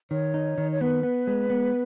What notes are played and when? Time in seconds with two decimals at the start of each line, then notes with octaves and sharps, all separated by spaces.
0.11 D#3 C#5
0.34 D#4
0.58 D#3
0.72 C#5
0.81 B3 B4
1.03 B3
1.27 G#3
1.50 B3